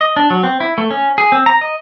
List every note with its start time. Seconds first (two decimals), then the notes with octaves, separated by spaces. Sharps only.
0.01 D#5
0.16 D4
0.30 F#3
0.43 C4
0.60 E4
0.78 A3
0.91 C#4
1.18 G#4
1.32 C4
1.46 A#5
1.61 D#5